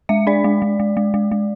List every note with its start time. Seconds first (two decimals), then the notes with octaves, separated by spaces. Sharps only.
0.09 G#3 E5
0.27 D4 D5
0.44 G#3
0.62 G#3
0.80 G#3
0.97 G#3
1.14 G#3
1.32 G#3